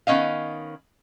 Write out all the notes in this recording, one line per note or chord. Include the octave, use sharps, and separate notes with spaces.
D#3 B3 C#4 D#5 F5